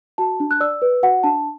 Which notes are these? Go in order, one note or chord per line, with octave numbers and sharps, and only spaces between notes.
F#4 A5
D4
F#6
D5 E6
B4
F#4 F#5
D4 A5